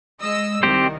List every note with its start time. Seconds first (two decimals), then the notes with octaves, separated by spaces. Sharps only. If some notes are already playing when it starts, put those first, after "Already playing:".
0.21 G#3 D#5 E6
0.63 C2 D#3 C4 G4 C5